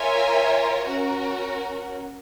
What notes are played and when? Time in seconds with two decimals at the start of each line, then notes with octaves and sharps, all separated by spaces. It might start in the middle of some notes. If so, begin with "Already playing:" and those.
Already playing: F4 A#4 C#5 E5 G#5
0.85 C#4 F#4 A#4